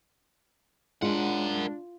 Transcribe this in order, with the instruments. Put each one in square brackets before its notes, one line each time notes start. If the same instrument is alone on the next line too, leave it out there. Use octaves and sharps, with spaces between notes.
[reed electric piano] G#3 [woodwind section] D4 [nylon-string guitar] F4 [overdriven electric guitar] A#4 F#5